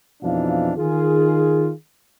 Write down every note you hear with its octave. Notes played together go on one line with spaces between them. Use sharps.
F2 B2 E3 D4 D#4 F5
D#3 F4 G#4